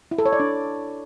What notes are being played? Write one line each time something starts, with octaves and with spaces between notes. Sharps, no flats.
E4
A4
C#5
D5
D4